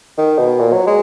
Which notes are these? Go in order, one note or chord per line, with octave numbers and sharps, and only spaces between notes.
D#3
B2
A#2
F#3
G#3